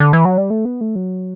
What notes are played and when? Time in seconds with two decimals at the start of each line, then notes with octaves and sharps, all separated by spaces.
0.00 D3
0.13 E3
0.25 F#3
0.37 G3
0.50 A3
0.65 B3
0.81 A3
0.95 F#3